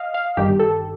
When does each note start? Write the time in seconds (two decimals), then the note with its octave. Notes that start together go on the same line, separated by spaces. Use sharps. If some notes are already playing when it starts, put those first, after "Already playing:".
Already playing: D#5 F5
0.14 F5
0.37 G1 G2 D#3 G4
0.59 A4